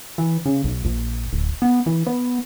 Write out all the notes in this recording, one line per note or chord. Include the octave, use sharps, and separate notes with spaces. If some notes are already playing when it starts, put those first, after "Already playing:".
E3
C#3
B1
A#1
D1
B3
E3
B3